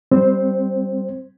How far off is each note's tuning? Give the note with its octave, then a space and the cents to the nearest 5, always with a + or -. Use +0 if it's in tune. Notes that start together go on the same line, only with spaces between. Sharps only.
G3 +0 C4 -5 C5 +10